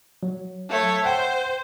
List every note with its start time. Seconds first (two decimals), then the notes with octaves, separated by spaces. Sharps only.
0.23 F#3
0.69 A3 C#5
1.05 C5 F#5 G5